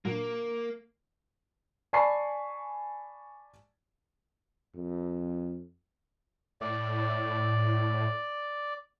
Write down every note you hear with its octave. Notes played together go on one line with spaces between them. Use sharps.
A#2 D3 F#3 A#3
D5 G#5 A5 B5 C#6 C7
F2
A2 D5